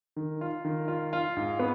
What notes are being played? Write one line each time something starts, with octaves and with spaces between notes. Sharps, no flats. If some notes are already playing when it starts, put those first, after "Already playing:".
D#3
F4
D#3
F4
F4
G#2
B3